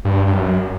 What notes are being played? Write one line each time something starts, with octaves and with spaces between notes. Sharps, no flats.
G2
G2
F#2